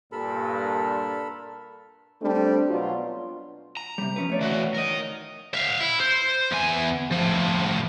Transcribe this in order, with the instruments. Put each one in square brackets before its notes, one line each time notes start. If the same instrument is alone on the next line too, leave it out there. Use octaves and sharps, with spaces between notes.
[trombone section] G2 A#2 [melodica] A4 A#4 B5
[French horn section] G3 A3 C4 D4
B2 F#3 D4 F4
[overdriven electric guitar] A#5
[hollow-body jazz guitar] C3 G3
F3 C#4 B4
A3 C#5 D5
[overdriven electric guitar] E3 F#4
A#4 D#5
[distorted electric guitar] E5 F5
E4
C5
E2 G#5
A2 F3